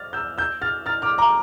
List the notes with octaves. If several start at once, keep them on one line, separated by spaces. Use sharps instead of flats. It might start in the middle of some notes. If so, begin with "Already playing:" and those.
Already playing: F6 A6
E6 G6
E6 G6
F6 A6
F6 A6
D6 F6
A#5 D6